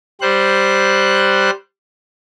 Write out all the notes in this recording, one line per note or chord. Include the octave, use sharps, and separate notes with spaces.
G3 C5 F#6